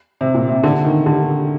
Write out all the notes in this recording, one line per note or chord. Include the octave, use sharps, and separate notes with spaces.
C3
A#2
C3
D3
D#3
D3